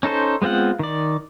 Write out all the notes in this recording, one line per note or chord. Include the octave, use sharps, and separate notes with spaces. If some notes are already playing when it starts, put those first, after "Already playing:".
C#4 D#4 A4 C5
G#3 B3 C4 F4 F#5
D#3 D5